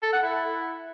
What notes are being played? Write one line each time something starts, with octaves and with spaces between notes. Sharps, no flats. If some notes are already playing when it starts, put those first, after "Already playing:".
A4
F#5
E4